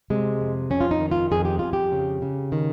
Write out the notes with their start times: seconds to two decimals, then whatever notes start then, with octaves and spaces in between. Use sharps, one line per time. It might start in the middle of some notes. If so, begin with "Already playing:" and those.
0.10 C3 G#3
0.40 F2
0.70 F2 C#4
0.81 F4
0.91 D#4
1.00 D#3
1.11 F4
1.31 F2 G#4
1.45 G4
1.59 F2 F4
1.73 G4
1.92 C#3
2.22 C#3
2.52 D#3